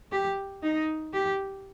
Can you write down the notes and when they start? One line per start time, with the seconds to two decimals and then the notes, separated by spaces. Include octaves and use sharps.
0.12 G4
0.63 D#4
1.13 G4